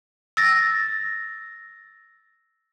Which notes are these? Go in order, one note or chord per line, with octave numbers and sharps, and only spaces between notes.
E6 A6 A#6